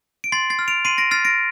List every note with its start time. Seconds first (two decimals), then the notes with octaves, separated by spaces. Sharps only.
0.24 D7
0.32 C6 A6 C7
0.50 A6 C7
0.59 F6
0.68 D7 F7
0.85 C6 C7 D#7
0.98 A#6 D7
1.11 F6 A6 C7
1.25 A#6 D7